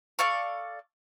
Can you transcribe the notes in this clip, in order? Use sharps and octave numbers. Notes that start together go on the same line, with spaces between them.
A4 D5 F5 C#6